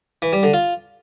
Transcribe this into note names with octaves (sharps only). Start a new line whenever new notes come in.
E3
G3
D3
F4